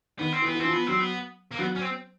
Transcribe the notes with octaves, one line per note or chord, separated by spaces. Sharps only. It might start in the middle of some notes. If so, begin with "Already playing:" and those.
D#3 B3
C4
E3
B3
E3 C4
F3
B3
F#3 C4
B3
A#3
F#3 B3
C#4
C4